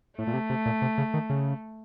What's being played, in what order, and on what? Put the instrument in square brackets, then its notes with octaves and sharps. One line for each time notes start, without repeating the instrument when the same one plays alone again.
[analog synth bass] A2 [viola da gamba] A3
[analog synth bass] A#2
C3
C3
A#2
C3
C#3
D#3
C#3